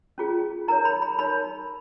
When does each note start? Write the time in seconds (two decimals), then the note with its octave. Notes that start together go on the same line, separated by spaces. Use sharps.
0.18 C#4 F4 G#4
0.68 D#4 A#4 C#5 A#5
0.85 B5
1.02 B5
1.19 D#4 A#4 C#5 B5